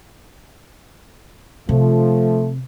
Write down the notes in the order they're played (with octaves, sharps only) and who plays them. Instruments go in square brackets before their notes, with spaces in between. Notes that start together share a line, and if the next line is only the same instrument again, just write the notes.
[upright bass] C3 [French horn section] F3 A3